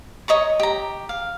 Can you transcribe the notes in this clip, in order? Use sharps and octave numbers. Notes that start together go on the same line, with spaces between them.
C#5 D#5 A#5 C#6
G4 A#5
F5